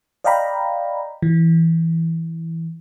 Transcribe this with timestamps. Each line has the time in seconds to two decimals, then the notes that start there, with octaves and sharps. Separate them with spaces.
0.24 D5 D#5 F5 G5 A#5 B5
1.22 E3